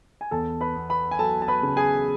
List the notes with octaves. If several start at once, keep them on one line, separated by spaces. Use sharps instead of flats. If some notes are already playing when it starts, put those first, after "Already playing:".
G#5
E2 A4 A5
B4 B5
B3
B4 B5
G#5
F#3 A4 A5
A5
B4 B5
C#3
G#4 G#5